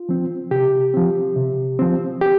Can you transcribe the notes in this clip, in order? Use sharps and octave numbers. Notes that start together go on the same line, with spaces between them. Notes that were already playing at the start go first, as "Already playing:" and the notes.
Already playing: F4
F3 C4
C3 G4
F3 C4
C3
F3 C4
G4